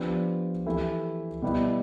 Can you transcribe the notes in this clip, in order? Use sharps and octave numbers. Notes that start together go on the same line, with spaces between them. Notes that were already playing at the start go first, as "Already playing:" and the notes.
Already playing: F3 B3 D4 G4 B4
E3 A3 E4 G4
B2 G3 B3 E4